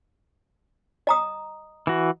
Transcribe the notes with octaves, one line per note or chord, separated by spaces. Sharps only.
D#5 A#5 D#6
E3 F#4